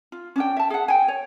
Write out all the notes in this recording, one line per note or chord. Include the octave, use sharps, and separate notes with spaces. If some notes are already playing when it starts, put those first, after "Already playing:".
F4
C#4 D4 G5
E5 A5
G#4 F#5
G5 G#5
C#5